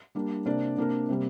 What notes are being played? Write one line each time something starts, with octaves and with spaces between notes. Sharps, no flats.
G3 A#3 D4
C3 A#3 D4 A#4 D5
C3 A#3 D4 A#4
C3 G3 A#3